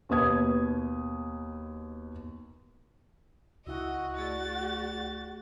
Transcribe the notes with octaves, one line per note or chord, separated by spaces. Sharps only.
D#2 B2 B4 D#6 G#6
C#2 E4 F#4 D#5 F#5 E6
A3 G#4 D5 A6